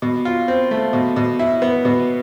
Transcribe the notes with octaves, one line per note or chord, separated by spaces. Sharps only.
B2
F4
C4
A3
B2
B2
E4
B3
B2